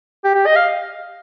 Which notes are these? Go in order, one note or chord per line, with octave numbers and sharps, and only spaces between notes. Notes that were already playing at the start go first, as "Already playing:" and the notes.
G4
G4
D#5
F5